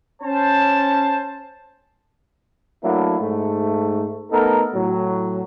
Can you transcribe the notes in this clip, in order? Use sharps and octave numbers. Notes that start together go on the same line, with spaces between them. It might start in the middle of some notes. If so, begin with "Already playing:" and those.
C#4 C5 A5
F#3 A3 A#3 D4 E4
G#2 A3
A3 B3 D#4 A4 A#4
A2 F#3